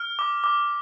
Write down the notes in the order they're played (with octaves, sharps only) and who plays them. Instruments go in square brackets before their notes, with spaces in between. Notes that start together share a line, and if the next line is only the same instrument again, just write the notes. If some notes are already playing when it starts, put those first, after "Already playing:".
Already playing: [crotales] F6
D6
D6